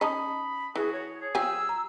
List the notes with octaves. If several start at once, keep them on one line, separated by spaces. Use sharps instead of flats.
C#4 D#4 A5 B5 D#6
E3 F#4 G#4
C#5
G#4
F3 G4 G#5 E6
A#5